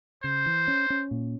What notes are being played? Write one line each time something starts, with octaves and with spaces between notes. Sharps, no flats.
C#3 C5
E3
C#4
C#4
A#2